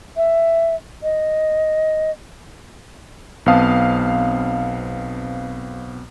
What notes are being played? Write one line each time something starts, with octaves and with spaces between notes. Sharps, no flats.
E5
D#5
B1 B3 C4 F5 A5 D#6